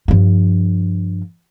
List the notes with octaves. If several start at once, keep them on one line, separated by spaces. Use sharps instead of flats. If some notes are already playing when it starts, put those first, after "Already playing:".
G2 F3